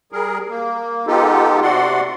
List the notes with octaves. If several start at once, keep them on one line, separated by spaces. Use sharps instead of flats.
G3 G#4 A#4
A#3
G#3 B3 D#4 F4 G4 A4
C3 F#4 D5 F#5 C6